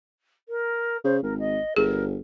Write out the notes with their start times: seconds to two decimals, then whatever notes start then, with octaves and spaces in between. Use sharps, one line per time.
0.48 A#4
1.04 C#3 C5
1.22 G#1 A#4
1.39 D#5
1.76 G1 G#4 A#4